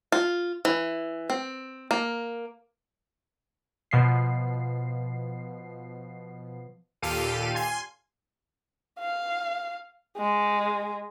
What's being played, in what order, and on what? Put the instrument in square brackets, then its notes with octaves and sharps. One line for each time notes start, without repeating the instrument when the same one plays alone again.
[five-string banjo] F4
E3
C4
A#3
[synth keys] B2 F3 C7
[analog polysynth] D#2 A#2 G4 A4 F5 D#7
G#5 C6
[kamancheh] F5
G#3